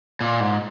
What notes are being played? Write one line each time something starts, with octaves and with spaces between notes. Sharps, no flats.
A#2
G#2